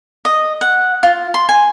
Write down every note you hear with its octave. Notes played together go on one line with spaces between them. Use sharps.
D#5
F#5
F4
C6
G#5